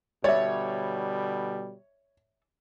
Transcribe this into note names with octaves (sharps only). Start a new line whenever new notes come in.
B2 D3 G3 C#5 D5 E5